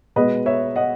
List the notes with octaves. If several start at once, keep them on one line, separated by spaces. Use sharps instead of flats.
B2 G#3 B3 B4 D#5
C#5 E5
D#5 F#5